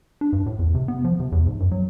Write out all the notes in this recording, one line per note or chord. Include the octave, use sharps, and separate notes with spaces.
D4
G2
A2
E2
C3
B3
F3
C3
E2
G#2
F#2
F#3